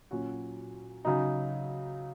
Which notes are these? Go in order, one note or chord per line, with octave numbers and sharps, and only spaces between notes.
A#2 F#3 C#4 F#4
C#3 F#3 D#4